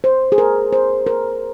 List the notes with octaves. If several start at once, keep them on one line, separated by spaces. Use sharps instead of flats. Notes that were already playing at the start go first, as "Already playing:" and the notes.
C5
G#4
A#4
C5
A#4